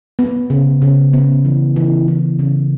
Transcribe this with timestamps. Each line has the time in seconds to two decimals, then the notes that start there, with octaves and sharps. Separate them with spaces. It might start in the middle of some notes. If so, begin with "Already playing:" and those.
0.19 B3
0.50 C#3
0.82 C#3
1.13 B3
1.45 E3
1.76 E3
2.08 E3
2.39 C#3